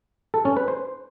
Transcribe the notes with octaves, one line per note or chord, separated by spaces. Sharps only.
A4
C#4
B4
C5